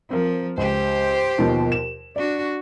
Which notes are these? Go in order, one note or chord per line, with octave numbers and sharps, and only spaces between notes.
F3 C4 A#4
C#2 G4 C5
D#2 B2 F3
E7
D4 F#4 D5